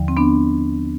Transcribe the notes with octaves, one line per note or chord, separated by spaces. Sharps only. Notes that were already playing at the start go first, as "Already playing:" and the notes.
Already playing: D#2 D3 F3
C4
B3 D4